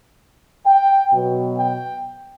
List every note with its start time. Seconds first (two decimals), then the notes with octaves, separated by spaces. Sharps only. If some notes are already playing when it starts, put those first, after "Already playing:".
0.66 G5
1.13 B2 F#3 B3
1.59 G5